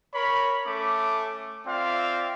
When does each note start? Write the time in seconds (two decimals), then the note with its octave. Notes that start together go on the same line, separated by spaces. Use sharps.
0.14 A#4 C#5 B5
0.66 A3 C#4 D6
1.67 C4 F4 D5 E5 F5